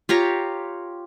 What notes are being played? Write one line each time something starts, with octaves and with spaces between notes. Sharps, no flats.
F4 G4 C#5 A#5